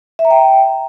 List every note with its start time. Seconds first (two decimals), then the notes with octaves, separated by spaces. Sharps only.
0.19 E5
0.25 A#5
0.30 G5